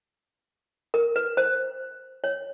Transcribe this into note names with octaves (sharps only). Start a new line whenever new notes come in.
A#4
B4
C5
C#5